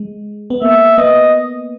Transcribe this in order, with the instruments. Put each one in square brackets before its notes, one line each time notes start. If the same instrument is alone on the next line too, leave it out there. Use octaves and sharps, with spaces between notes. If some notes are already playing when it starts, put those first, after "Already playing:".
Already playing: [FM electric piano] G#3
B3
[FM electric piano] A#3 [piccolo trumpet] E5
[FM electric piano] B3 [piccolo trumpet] D#5